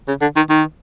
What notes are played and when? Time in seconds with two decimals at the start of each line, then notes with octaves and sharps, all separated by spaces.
0.08 C#3
0.21 D3
0.36 D#3
0.50 D#3